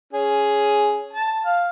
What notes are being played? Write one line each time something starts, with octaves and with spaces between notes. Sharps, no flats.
C#4 G#4
A5
F5